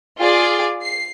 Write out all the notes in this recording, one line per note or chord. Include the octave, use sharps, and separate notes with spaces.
F4 G#4 D5
C7